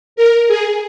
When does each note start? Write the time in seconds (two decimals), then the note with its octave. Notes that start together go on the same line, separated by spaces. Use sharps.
0.16 A#4
0.47 G#4